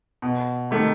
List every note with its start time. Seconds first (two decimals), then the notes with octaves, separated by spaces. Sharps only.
0.22 B2
0.71 C3 D#3 A3